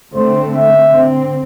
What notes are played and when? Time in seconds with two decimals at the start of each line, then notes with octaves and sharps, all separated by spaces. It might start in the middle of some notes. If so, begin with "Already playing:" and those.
0.14 D3 A3 C4 C5
0.52 E5
0.89 D3 C4